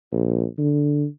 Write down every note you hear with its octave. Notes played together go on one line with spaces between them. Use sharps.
A#1
D3